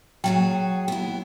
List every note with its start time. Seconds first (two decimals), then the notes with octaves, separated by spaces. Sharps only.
0.24 F#3 F#4 G#4 G5
0.88 B3 E4